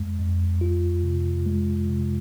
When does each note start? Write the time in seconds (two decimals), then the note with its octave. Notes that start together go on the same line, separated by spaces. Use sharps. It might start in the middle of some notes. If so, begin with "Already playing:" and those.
Already playing: F2 G#3
0.19 F2
0.61 F4
1.03 C3
1.46 G#3
1.89 C3